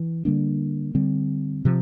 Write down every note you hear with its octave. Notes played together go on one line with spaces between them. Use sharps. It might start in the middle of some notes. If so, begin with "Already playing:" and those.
Already playing: E3
D3 G3 A#3 D4
D3 G3 C4
C3 F3